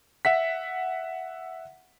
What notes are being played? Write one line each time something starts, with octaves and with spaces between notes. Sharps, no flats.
E5 F#5 B6